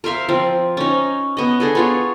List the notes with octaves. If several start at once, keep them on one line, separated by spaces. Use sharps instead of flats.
A#4 C5 E5 F5
F3 C4
C#4 D#4
B3 D#5
D4 G#4 A4
B3 F4 C#5